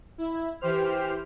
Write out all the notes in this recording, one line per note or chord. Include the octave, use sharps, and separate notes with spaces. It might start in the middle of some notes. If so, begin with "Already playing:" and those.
E4
E3 G4 C5 F6